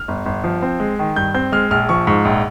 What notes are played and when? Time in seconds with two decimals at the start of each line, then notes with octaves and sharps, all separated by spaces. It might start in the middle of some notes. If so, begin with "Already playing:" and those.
Already playing: F6
0.08 G1
0.26 G1
0.44 F3
0.62 C4
0.80 G#3
0.99 D#3
1.16 G2 G6
1.34 C4 G6
1.52 G#3 F6
1.71 A#1 F6
1.89 F3 C#6
2.07 G#2 C#6
2.25 A#1